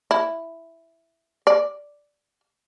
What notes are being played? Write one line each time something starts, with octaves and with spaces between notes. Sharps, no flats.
E4
D5